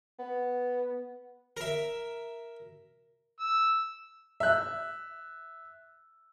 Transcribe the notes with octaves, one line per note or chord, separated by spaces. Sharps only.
B3
A#4 E5
E6
E5 F#6